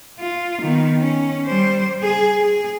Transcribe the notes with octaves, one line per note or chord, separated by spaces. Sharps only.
F4
D#3 B3
C#4
G3 C5
G#4
G#4